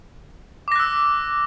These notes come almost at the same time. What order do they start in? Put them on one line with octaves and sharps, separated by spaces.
D6 A#6 F#6 E6